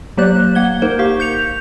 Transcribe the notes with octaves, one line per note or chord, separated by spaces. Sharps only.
F#3 A#3 G4 C5 D5 F#6
A#3 F#5 G#6 G7
A#3 D#4 A#4 C5
G4 F5 C#6
G6 C#7 F7